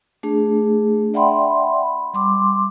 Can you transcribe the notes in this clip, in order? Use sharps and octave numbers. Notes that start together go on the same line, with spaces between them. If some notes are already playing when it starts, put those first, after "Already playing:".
A3 D4 G#4
D5 E5 F#5 G5 B5 C6
G3 C6 D6